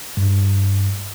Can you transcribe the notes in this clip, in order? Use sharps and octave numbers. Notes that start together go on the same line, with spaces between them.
G2